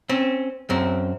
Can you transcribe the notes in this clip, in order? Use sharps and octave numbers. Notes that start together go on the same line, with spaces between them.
C4 C#4
F#2 C4